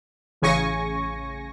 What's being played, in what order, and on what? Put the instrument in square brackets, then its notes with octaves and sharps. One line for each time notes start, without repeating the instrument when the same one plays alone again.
[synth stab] A1 C#3 G#5 C#6 A#6